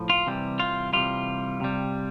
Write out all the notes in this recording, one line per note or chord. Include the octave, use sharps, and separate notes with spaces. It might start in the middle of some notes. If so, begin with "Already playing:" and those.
Already playing: A2 F3
F4
C3 E3 G3
F4
C3 E3 G3 F4
C3 G3